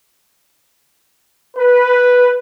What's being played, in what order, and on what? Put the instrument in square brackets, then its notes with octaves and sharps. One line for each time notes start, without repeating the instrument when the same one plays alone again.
[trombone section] B4